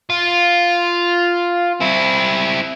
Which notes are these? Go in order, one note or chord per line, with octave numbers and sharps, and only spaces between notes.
F4
C4 E4